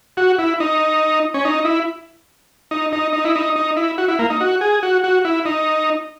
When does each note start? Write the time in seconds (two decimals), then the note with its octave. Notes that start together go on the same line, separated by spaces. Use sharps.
0.17 F#4
0.39 E4
0.60 D#4
1.34 C#4
1.45 D#4
1.65 E4
2.71 D#4
2.92 D#4
3.13 D#4
3.25 E4
3.36 D#4
3.56 D#4
3.77 E4
3.98 F#4
4.08 E4
4.19 A#3
4.30 D#4
4.41 F#4
4.61 G#4
4.83 F#4
5.04 F#4
5.25 E4
5.45 D#4